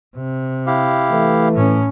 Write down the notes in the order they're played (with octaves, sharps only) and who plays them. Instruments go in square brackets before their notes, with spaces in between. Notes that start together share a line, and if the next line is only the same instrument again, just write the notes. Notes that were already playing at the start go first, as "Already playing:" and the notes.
[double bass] C3
[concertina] E4 G4 F5
[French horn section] E3 A3
[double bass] A2 C#4